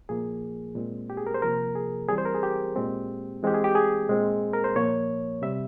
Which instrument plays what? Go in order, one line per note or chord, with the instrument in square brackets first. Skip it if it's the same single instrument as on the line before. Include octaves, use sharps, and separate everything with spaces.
[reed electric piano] A#2 F3 A#3 G#4
A#2 G#3 C4
G4
G#4
A#4
C5
C3 F3 A#3 A#4
G#4
E3 G3 C4 G#4
C5
A#4
G#4
G4
A#2 G#3 C4
E3 G#3 C4 G4
G#4
G4
G#4
A#2 G#3 C4
A#4
C5
A#2 F3 A#3 C#5
C3 G3 C4 E5